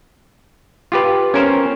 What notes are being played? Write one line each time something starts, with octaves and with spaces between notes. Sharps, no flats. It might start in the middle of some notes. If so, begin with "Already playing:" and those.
F4 G4 B4
C#4 A#4 C5